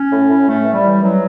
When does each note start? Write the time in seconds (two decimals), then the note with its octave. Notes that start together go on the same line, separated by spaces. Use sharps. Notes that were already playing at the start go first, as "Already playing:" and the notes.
Already playing: C#4
0.10 A2
0.29 A2
0.46 A2 A3
0.65 E3
0.74 G3
0.83 E3
1.01 E3 F#3